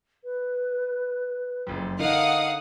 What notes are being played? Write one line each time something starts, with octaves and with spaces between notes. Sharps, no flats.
B4
F#1 F2
D3 D#4 A#4 D#5 F5 F#5 D#6